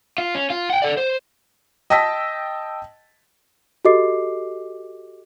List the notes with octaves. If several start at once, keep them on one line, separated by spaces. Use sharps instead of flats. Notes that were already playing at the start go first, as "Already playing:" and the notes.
F4
C#4
F4
F#5 G5
A4 D5
C5
D#5 G5 A5 E6 B6
F#4 G4 A4 D#5 D6 C7